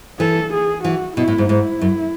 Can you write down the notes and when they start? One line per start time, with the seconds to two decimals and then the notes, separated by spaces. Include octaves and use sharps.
0.20 E3 A4
0.53 G#4
0.84 E3 F#4
1.17 B2 E4
1.28 A2
1.38 G#2
1.49 G#2 E4
1.81 F#2